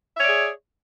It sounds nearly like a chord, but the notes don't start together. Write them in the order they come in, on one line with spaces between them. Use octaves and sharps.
E5 C#5 D5 G#4